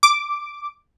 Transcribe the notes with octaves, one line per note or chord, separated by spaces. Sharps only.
D6